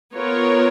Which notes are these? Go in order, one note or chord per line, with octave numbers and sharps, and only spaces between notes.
B3 F4 A#4 C#5